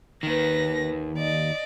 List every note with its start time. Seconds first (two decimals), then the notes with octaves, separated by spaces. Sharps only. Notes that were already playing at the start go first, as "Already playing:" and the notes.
0.23 D#2 D#3 B4 A#6
1.18 D5 D#5